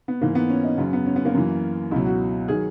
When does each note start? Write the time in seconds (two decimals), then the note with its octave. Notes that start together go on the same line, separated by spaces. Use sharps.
0.08 B3
0.21 G#2 E3 A#3
0.35 B3
0.49 C#4
0.64 D#4
0.78 F#2 C#3 F#3 B3
0.93 B3
1.06 C#4
1.16 B3
1.25 A#3
1.35 F#2 E3
1.91 C#2 B2 F#3 E4
2.06 F#4
2.48 D#3 F#3 G#4